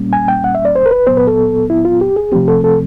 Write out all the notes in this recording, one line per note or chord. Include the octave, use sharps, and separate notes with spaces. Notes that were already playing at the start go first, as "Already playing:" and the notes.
Already playing: A#2 G3 A#3 C#4
G#5
G5
F#5
E5
D5
C5
A#4
B4
A#2 F#3 B3 C5
B4
A4
E4
F4
G4
G#4
C3 F3 A3 C4 G4
A4
A4